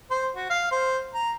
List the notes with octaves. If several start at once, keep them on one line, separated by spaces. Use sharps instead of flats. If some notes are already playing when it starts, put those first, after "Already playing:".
C5
F#4
F5
C5
A#5